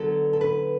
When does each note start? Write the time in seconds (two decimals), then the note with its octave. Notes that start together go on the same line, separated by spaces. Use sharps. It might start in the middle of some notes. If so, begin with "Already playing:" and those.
Already playing: D3 F#3 B3 A4
0.33 A4
0.41 B4